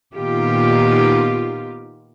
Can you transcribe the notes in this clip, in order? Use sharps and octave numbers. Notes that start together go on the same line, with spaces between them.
A#2 D#3 B3 F4 G4